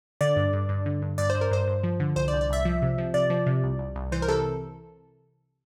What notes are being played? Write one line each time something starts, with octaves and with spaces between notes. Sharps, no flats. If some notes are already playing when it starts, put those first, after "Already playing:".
D3 D5
G2
G2
G2
D3
G2
G2 D5
G2 C5
A#4
G2 C5
G2
F3
D3
C2 C5
D5
C2
D5
C2 E5
F3
C3
F3
C3 D5
F3
C3
C2
C2
C2
E3 C5
A#4
C3 A4